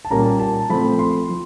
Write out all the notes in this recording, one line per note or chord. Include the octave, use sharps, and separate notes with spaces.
A5
A#2 G3 A#3 C#4 A#5
A5
F3 A3 C4 B5
C6
F3